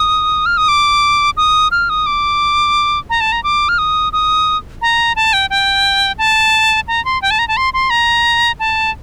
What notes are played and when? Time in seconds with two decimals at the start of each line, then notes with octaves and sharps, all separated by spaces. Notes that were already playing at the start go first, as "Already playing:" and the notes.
Already playing: D#6
0.46 F6
0.57 D#6
0.68 D6
1.37 D#6
1.71 F6
1.90 D#6
2.06 D6
3.10 A#5
3.21 A5
3.32 A#5
3.44 D6
3.69 F6
3.78 D#6
4.13 D#6
4.82 A#5
5.16 A5
5.33 G5
5.50 G5
6.18 A5
6.88 A#5
7.05 C6
7.22 G5
7.31 A5
7.39 A#5
7.48 A5
7.57 C6
7.74 C6
7.90 A#5
8.60 A5